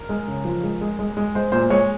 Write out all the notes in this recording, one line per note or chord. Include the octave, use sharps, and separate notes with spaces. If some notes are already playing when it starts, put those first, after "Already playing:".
Already playing: A#4
G#3
C#3
F3
G#3
G#3
G#3
G#3
G#3 C5
A#2 C5
G#3 C#5